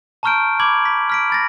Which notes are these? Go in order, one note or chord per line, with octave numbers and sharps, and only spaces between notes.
A5 A#5 C#6 F6 G6 D7
B5 D6 G#6 F#7
B6
F6 B6 D7
B5 A6 A#6